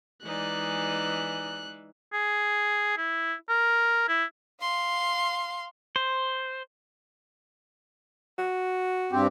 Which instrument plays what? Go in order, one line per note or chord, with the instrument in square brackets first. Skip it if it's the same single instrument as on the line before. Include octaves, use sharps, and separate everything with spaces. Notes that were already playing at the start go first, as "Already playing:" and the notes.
[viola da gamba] E3 G#3 [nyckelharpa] D#4 D5 [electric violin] F#6
[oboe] G#4
E4
A#4
E4
[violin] F5 C6
[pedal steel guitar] C5
[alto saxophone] F#4
[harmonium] G2 C4 G4